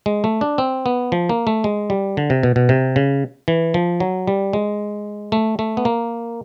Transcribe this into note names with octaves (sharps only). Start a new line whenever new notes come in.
G#3
A3
D4
C4
B3
F3
A#3
A3
G#3
G3
D3
C3
B2
B2
C3
C#3
E3
F3
F#3
G3
G#3
A3
A3
B3
A#3